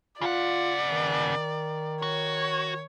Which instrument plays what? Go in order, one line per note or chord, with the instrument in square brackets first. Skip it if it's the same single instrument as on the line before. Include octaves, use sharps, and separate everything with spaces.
[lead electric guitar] C#3 F#5 [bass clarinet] F4 [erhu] D5
[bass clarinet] D#3
[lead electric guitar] F#4 [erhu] C#5